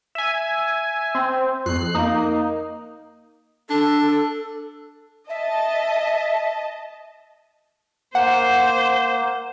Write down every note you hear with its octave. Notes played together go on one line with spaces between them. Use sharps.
E5 G#5
C4
F2 F#6 C7
A#3 D#4
D4 A4
D#5 E5 A5
A#3 C5 F#5